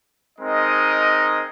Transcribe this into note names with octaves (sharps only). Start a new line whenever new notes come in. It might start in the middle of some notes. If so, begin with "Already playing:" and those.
G#3 C4 D#4 A#4 D#5